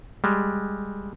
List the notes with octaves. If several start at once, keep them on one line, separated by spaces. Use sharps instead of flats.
G3 G#3